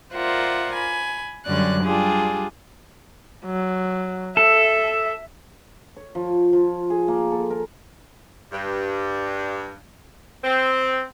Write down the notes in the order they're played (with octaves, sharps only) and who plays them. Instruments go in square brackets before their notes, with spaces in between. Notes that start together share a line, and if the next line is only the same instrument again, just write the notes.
[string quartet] F4 A#4 C5 D5 E5 F#5
G#5 B5
F#2 D3 G3 C#4 D5 F#6
G3 D4 F4 G4 G#4
[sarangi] F#3
[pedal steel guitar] A4 [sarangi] E5
[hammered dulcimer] C#5
F3
F3
G#4
A#3
A4
A#4
[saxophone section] G2
C4